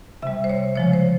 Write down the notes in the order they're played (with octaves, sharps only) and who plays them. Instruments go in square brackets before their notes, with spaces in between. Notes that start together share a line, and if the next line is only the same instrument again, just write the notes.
[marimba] C3 G3 E5
C5
C#5
C#3 F3 G#3 C#5
C5